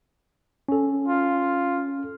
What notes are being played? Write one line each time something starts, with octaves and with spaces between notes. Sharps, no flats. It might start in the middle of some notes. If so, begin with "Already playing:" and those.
C#4 A4
F4